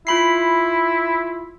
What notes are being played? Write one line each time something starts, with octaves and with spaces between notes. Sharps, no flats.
E4 F4 B5 C7